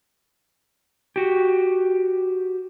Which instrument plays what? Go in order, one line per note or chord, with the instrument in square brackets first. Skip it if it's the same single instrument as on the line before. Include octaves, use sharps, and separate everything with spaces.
[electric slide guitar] F#4 G4